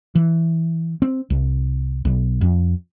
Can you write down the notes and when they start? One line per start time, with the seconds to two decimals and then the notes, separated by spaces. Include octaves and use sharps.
0.15 E3
1.02 C4
1.30 C2
2.05 B1
2.41 F2